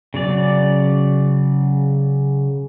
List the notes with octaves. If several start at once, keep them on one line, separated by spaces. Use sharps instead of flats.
C#3 F#3 D5